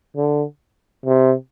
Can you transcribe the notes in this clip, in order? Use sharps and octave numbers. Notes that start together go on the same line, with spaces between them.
D3
C3